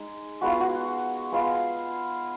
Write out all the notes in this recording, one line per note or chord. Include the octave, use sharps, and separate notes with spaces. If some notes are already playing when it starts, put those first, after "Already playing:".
Already playing: G#3 D#4
G#3 B3 F4 F#4
F4
F#4
G#3 B3 F4